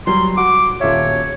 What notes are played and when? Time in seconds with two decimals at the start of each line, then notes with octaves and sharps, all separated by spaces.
0.07 F#3 G3 C6
0.37 F#4 D6
0.81 D#1 F4 C#5 E5